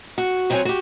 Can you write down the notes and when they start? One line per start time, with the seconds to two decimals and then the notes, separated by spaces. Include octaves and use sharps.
0.18 F#4
0.50 C3 F#3 C4 F#4 C#5 G#5
0.65 F#4 G4